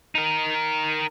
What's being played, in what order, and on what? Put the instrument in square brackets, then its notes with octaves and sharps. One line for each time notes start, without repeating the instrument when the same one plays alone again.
[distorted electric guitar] D#4 A#4